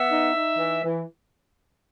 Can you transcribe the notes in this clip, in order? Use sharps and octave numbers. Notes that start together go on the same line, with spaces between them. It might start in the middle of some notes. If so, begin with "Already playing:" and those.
Already playing: B3 E5
D#4
D#4
E3
E3